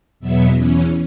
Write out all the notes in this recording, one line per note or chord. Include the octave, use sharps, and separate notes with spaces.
E2 B2 F#3 B3 E5
E2 E3 C#4